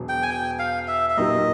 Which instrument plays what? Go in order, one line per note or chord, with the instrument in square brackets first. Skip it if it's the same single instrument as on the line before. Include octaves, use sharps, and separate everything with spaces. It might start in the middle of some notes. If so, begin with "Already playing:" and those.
Already playing: [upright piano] E1 E2 B2 F#3
[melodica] G5
G#5
G5
F5
E5
E5
[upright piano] A#2 F#3 A#3 D#4 G4 [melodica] D#5